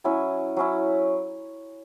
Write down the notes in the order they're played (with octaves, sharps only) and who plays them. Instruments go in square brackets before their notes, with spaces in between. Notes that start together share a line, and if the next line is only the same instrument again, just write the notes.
[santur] F#3 C#4 E4 G#5
F#3 C#4 E4